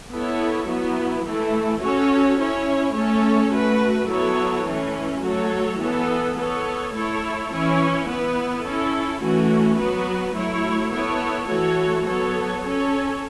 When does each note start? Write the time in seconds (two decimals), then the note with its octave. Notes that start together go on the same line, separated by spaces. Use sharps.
0.11 B3 E4 A4 C#5
0.68 F#3 B3 E4
1.25 E3 A3 E4 A4
1.82 C#4 F#4 A4 C#5
2.39 C#4 E4 C#5
2.95 A3 C#4 A4 C#5
3.53 A3 F#4 B4
4.09 F#3 B3 E4 A4 C#5
4.67 E3 A3 C#4
5.23 F#3 A3 F#4 A4 C#5
5.80 E3 B3 A4
6.37 B3 A4 C#5
6.94 A3 E4 A4 C#5
7.51 E3 C#4 E4 C#5
8.07 B3 E4 B4
8.64 C#4 E4 A4
9.21 E3 A3 C#4 F#4
9.78 F#3 B3 F#4 B4
10.36 F#3 A3 E4 C#5
10.92 B3 E4 A4 C#5
11.48 E3 A3 F#4 A4 C#5
12.06 F#3 B3 A4 C#5
12.63 C#4 A4 C#5